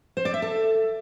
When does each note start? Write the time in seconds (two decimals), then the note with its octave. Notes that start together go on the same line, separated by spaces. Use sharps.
0.17 C5
0.25 D5
0.34 E5
0.42 A4